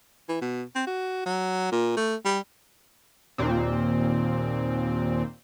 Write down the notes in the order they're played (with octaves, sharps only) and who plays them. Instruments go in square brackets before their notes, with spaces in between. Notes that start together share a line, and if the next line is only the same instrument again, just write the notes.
[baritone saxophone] E3
B2
C4
F#4
F#3
A#2
A3
G3
[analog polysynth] D#2 A#2 C4